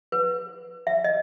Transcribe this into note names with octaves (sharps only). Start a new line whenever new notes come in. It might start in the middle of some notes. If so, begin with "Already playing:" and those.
B4
E5
D#5